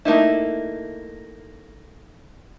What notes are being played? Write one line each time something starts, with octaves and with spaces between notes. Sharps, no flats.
A3 A#3 D#4 E4